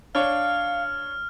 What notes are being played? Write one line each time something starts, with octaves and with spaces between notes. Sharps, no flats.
D4 C#5 F5 F6